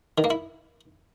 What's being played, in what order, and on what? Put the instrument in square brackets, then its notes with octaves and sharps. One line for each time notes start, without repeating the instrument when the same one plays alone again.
[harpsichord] D#3
A#3
E4